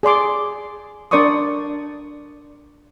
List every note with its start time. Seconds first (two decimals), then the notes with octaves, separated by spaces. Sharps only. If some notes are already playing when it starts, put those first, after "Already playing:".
0.03 G#4 D5 C6 D6
1.11 D4 A#4 D5 C6 C#6 D#6